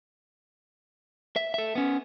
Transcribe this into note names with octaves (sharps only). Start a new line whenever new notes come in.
E5
A4 E5
B3 C#4